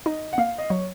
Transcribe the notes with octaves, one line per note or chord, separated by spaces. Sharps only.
D#4 D#5
F#5
A#3 F5
D#5
F#3 C#5